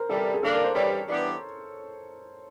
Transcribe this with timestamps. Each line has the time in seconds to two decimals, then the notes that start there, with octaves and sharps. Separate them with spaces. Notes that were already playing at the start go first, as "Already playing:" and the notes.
Already playing: A#4 C5
0.09 C3 E3 G3 A4
0.18 A#4
0.34 G#4
0.43 D3 G3 A#3 D4 A4
0.54 A#4
0.64 C5
0.75 G2 E3 G3 C#5
1.08 E3 G3 B3 D4 G4